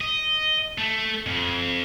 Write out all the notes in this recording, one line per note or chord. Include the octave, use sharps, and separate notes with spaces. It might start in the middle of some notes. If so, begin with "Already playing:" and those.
D#5
A3
F2